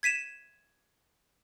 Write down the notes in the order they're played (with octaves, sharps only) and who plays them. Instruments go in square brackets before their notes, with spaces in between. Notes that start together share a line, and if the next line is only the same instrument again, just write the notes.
[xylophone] G#6 B6 D#7 E7